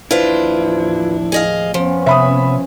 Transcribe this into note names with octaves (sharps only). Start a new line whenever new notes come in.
A1 D#2 F3 D4 E4 F4 B4 C5
G#4 D#5 F5
F2 F3 B3 C#4
C3 E5 B5 D#6